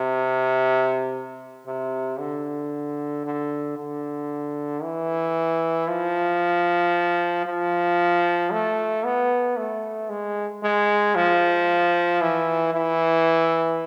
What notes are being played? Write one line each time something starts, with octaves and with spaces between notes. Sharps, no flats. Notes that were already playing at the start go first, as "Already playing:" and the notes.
Already playing: C3
C3
D3
D3
D3
E3
F3
F3
A3
B3
A3
G#3
G#3
F3
E3
E3